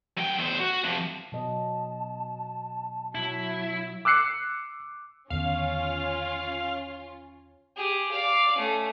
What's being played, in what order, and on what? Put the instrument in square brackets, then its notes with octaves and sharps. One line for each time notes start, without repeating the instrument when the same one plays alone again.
[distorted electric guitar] F#2 G5
E2 C5
F#4
C3 F3
[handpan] B2 F#3 D#5 [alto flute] A5
[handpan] B2 [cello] F#3 [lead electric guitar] E4
[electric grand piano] D6 E6 F#6 C7 C#7
[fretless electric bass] E2 D3 D#3 [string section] C#4 F4 [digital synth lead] F5
[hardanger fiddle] G4 G#4
D5 F5
A3 C#4